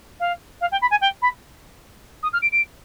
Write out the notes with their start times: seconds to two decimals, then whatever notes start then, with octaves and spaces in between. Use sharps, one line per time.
0.20 F5
0.61 F5
0.72 G5
0.82 B5
0.91 G#5
1.01 G5
1.22 B5
2.23 D#6
2.33 F6
2.42 D7
2.52 D7